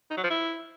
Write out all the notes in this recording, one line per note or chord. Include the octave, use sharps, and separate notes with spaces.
D#4
F#3
F3
E4